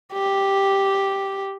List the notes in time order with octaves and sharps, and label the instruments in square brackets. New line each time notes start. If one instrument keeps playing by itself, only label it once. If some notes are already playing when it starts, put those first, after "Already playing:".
[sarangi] G4